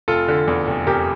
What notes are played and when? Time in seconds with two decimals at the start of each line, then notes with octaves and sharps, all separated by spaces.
0.08 F1 F4 A4
0.28 D3
0.47 E2
0.67 F1
0.87 F1 G4 A#4